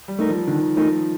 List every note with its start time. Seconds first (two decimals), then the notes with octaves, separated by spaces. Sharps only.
0.08 G3
0.19 A3 D#4 A#4
0.29 F3
0.47 D3 D#3
0.76 F3 A3 D#4 A#4